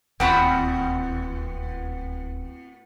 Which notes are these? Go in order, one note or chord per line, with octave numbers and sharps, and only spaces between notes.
D1 D#2 A2 B3 C4 F#4 F#5 B5